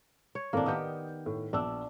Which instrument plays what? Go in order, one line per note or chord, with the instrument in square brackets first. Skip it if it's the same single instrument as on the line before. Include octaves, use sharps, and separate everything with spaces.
[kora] C#5
[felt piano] G#1 A2 C4 [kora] A#3 D4
[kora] D#3 B3 G4 [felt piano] D#6 G6
[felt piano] A2
[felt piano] A#1 B3 E6 [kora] D4